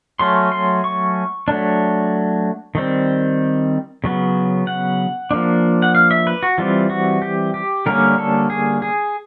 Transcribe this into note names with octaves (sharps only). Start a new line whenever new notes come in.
F#3 A3 C#4 C6
C6
C#6
F#3 A3 D4
D#3 G3 C4
C#3 F#3 B3
F#5
F3 A#3 D4
F#5
F5
E5
B4
F#4
E3 G3 C4 F4
F#4
G4
G4
D3 G3 A#3 C#4 A#4
A4
G#4
G#4